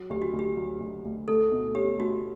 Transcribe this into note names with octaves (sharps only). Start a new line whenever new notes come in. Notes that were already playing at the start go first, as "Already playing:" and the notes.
Already playing: F#3
D2 G4
F#4
D2
G4
F#3
D2
D2
A3 A4
B2
C#4 G4
A3 F#4